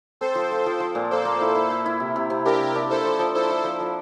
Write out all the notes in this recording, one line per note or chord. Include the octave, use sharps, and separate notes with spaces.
C4 A4 C5
F3
F4
F3
F3
A#2
A#3 A4 C5
A#3
E4
E4
E4
E4
C3
C3
C3
D4 G4 A#4
C3
D4
E4 A4 C5
F3
F3
E4 A4 C5
E4
F3
F3